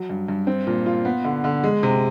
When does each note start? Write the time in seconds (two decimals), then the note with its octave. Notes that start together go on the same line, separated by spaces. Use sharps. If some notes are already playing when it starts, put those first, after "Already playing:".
Already playing: F#3
0.10 G2
0.28 G2
0.47 C4
0.67 A#2
0.86 F4
1.05 B3
1.24 D3
1.44 D3
1.64 G#3
1.83 C3